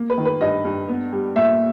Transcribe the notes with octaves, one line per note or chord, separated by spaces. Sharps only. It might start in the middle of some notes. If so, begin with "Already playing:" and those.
Already playing: A#3
B4
D#3
B4
G2 D#5
G2
B3
G3
A#2 E5